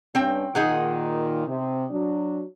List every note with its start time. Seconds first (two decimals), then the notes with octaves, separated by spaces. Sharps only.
0.15 G2 C4 C#4 G5
0.55 A#2 D#3 D#4 G#4 F#5
1.47 C3
1.90 F#3 D4